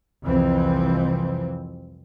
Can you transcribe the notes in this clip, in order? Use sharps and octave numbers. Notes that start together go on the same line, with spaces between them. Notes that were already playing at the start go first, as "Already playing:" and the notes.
C2 F2 E3 C4